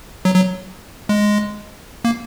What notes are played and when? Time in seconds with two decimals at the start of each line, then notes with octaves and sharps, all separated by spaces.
0.25 F#3
0.35 F#3
1.09 G#3
2.05 A#3